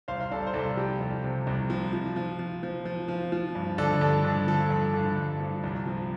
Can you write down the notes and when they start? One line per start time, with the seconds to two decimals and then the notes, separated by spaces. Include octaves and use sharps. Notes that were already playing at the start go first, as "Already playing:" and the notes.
0.08 C2 C5 F5
0.21 F5
0.31 C2 A4 D5
0.47 C5
0.54 C2 A4 D5
0.77 F3 G4
1.00 C2
1.24 C3
1.47 C2
1.70 F3
1.93 F3
2.16 F3
2.39 F3
2.63 F3
2.85 F3
3.08 F3
3.32 F3
3.55 G2
3.78 D3 A4 D5
4.01 G2 A4
4.24 D3
4.47 F3 A4
4.71 G2
4.94 D3
5.16 G2
5.40 F3
5.64 C2
5.86 F3